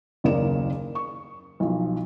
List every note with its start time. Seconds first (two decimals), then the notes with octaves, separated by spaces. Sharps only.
0.24 F#1 D#2 C#3 A#4 D5 E7
0.95 C#6
1.60 B1 F3